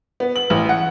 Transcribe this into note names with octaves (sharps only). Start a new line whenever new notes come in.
B3
F#7
A1
F#5